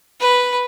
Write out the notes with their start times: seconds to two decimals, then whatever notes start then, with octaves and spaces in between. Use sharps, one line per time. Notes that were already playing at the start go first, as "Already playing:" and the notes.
0.20 B4